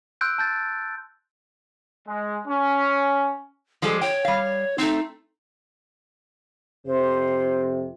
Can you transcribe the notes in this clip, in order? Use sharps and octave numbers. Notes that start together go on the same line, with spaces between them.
C6 E6 F#6 G6 D7
A5 G6 A6
G#3
C#4
F3 G3 G#3 A4
C#5 G5
G3 F5
A3 C4 D#4
F2 C3 C5